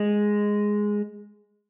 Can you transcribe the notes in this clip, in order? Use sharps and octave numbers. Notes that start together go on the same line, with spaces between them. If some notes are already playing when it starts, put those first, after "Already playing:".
Already playing: G#3